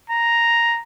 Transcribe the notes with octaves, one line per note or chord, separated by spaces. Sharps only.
A#5